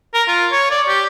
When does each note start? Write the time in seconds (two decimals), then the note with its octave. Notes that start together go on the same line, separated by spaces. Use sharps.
0.14 A#4
0.28 F4
0.52 C#5
0.71 D5
0.88 G4